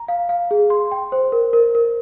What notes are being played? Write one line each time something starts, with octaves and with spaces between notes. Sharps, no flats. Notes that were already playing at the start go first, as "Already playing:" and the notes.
Already playing: A#5
F5
F5
G#4
C6
G5
C5
A#4
A#4
A#4